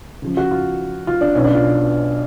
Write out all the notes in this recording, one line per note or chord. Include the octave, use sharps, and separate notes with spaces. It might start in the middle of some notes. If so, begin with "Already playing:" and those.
C#2 C#3 F3
F#4
F4
F4
D4
B1 B2 C#4
D4
F4